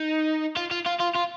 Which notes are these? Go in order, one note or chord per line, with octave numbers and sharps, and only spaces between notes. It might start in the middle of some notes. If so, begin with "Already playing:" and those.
Already playing: D#4
F4
F4
F4
F4
F4